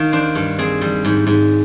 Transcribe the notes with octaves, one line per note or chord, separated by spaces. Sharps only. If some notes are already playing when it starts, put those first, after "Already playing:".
Already playing: D#3 A#3 F5
D4 C5
G2
C4 G#4
G3
G#2
G#2